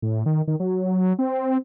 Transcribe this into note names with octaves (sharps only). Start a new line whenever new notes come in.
A2
D#3
D#3
F#3
C4